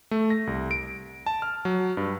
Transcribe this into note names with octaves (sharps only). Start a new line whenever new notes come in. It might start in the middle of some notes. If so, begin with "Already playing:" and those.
A3
A#6
C2
D7
A5
F6
F#3
G2